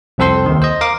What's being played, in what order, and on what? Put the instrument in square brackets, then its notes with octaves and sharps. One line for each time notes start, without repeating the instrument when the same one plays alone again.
[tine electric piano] C2 F2 C4 A4 C5 C6
D#2 D#3
C5 D#5
A#4 F5 D6